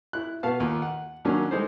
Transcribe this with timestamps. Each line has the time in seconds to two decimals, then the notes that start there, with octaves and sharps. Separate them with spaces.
0.13 E4 F#6
0.43 B2 B3 F5 A5
0.60 D#2 F4 D6
0.82 F#5
1.25 D#2 D#3 F#3 A#3 C#4 D4
1.51 G3 G#3 D#4 A4 C5